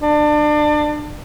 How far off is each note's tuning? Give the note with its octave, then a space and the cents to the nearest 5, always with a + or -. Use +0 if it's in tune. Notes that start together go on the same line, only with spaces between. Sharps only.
D4 +30